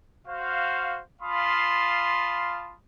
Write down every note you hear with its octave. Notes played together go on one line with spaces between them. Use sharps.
F#4 C5 F5
F4 F5 A5 B5 C6 D#6